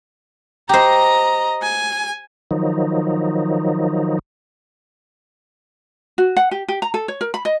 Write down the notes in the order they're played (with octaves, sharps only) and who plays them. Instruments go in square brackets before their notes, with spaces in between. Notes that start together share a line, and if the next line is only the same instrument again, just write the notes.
[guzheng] G4 C5 [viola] D#5 A#5
[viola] G#5
[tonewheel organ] D#3 F3 F#3 D#4
[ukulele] F#4
F#5
G4
G4
A#5
A4
C#5
A#4
B5
D#5